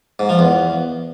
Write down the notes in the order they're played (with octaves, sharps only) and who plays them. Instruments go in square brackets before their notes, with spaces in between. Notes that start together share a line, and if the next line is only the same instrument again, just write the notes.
[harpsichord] G#2
F3
E2